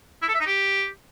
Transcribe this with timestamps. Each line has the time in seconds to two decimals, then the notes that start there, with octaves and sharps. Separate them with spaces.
0.22 E4
0.28 A4
0.34 E5
0.40 D#4
0.46 G4